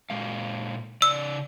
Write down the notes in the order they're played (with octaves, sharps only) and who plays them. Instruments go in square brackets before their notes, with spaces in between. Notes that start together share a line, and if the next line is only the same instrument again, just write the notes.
[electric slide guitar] A#2 G#3 F5
[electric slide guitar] C#3 D5 [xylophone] E6